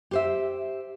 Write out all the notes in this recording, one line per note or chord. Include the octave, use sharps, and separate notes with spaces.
G4 C5 E5